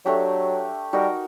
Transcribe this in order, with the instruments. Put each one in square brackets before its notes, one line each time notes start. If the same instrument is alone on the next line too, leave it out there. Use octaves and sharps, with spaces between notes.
[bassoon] F#3 [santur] A3 D4 G4
[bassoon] G3 [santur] D#4 F#4 A#4